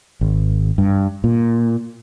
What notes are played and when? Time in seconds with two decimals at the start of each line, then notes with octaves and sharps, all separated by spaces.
0.21 G#1
0.78 G2
1.24 A#2